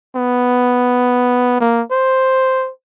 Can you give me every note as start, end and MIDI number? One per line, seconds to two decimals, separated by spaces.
0.16 1.59 59
1.60 1.82 58
1.91 2.71 72